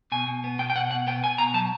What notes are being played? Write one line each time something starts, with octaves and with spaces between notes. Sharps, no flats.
B2 G#5
B2
B3
B2 G5
G5
B2 F#5
B2 F#5
B3 G5
B3 G#5
B2 A#5
F#3 A5